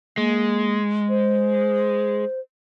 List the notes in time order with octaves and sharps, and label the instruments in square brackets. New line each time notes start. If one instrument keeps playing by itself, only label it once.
[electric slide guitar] G#3 [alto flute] A#3
[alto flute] C5